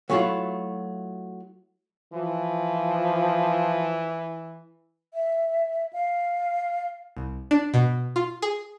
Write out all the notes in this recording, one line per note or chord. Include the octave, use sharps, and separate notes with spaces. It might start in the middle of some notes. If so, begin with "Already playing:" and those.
F#3 A3 C#4 E4 F4 E5
E3 F3
E5
F5
C2
D4
B2
F4
G#4